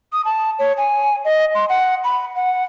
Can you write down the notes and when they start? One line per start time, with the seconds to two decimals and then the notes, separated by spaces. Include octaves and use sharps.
0.13 D#6
0.25 A5
0.59 C#5
0.77 G#5
1.25 D#5
1.55 C6
1.69 F#5
2.04 B5
2.36 F#5